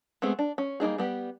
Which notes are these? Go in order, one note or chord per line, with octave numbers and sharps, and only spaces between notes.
G#3 A3 B3 C4 G#4
D4
C#4
G3 A#3 D#4 G#4
G3 B3 G4